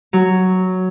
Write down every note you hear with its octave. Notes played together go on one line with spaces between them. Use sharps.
F#3